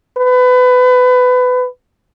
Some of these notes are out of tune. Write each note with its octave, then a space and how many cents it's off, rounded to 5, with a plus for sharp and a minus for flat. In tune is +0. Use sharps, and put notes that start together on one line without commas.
B4 +25